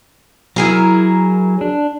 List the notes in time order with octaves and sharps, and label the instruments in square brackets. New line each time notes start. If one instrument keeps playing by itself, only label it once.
[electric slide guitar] F#3 [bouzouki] E4 G#4 A#4
[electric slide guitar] D4